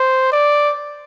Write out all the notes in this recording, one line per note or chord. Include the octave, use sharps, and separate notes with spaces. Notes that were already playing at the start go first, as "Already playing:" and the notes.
Already playing: C5
D5